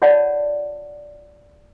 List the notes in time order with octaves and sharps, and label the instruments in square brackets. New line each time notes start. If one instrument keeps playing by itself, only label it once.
[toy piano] F4 C#5 D5 F#5 A5